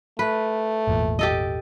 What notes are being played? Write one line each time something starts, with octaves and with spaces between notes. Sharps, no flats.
A3 B4
G#1 E2 A#2
G4 A4 D#5